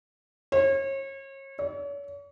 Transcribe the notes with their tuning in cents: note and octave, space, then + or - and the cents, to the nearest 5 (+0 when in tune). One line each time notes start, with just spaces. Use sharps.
C#5 -35
C#5 +40